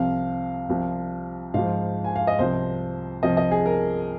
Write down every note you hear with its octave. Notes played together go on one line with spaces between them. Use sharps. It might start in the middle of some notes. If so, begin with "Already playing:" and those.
Already playing: C2 C3 F3 F5
C2 C3 F3
G#2 F3 F5
G#5
F5
D#5
C2 C3 F3 C5
C2 C3 F3 D#5
D#5
G#4
A#4